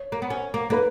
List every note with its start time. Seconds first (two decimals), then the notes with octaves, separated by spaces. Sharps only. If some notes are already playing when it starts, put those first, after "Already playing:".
Already playing: C#5
0.12 A#3
0.22 B3
0.30 C#4
0.54 A#3
0.70 A#3 B4